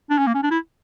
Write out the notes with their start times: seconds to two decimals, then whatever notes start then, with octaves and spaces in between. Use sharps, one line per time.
0.10 D4
0.19 C#4
0.27 A#3
0.34 C#4
0.43 D4
0.51 E4